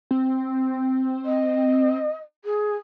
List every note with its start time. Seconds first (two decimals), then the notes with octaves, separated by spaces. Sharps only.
0.11 C4
1.25 D#5
2.44 G#4